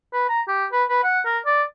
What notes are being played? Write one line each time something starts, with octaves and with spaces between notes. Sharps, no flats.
B4
A#5
G4
B4
B4
F#5
A#4
D5